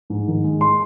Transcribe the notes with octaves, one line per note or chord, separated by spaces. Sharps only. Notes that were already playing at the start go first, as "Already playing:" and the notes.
G#2
D#3
G#3
C6